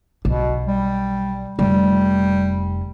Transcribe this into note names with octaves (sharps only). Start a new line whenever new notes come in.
B1 B2
G3
F1 G3